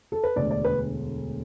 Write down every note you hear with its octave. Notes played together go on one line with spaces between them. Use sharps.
A4
B4
E1 D2 D3 D5
D5
B4